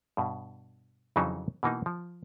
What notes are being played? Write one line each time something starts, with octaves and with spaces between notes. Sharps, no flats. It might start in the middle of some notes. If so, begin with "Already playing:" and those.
G2 B2
F2 C#3 E3 F#3 D#4 E5
B2 E3 A#3 D#4
F3